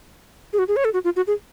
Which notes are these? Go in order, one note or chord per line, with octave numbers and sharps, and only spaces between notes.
G#4
F#4
G#4
C#5
A4
F#4
F4
F#4
G#4